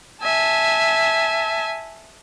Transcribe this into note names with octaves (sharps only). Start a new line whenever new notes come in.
E5 G#5 A5